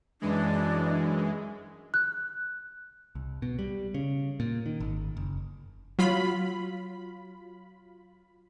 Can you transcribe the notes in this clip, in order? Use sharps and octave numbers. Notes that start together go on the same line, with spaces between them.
F#2 E3 G#3 D4
F#6
C2
B2
G3
C#3
A#2
D#3
G#1
F#1
F#3 F4 B5